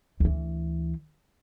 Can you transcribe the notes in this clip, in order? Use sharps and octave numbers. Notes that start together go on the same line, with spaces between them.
D2 E3